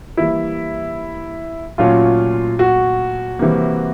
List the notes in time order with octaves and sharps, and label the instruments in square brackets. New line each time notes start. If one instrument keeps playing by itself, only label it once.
[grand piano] E3 G3 A#3 [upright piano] E4
[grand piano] A#2 F#3 A3 C#4 [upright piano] F4
[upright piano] F#4
[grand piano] C3 E3 G3 A#3